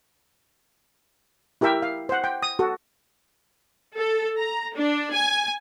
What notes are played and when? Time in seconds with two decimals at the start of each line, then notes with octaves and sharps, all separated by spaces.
1.61 E4 G4 A#4 E5 G5
1.82 F5
2.09 C5 F#5
2.24 G5
2.42 D#6
2.59 F#4 A4
3.96 A4
4.39 A#5
4.75 D4
5.13 G#5